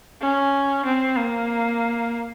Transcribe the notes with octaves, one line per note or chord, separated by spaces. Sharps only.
C#4
C4
A#3